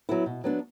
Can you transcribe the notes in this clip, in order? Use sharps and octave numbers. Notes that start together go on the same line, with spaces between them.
F#3 B3 E4
B2
F#3 B3 D4